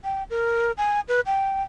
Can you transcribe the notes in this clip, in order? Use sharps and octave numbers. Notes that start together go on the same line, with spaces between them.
G5
A#4
G#5
B4
G5